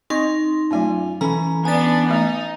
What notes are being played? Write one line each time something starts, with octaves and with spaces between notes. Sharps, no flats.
C4 D#4 D#5 C6 C#6
F#2 F#3 A3 C#4 F4 G#5
E3 C#4 A4 A#5 B5
B3 D4 G#5 A6
A3 D#4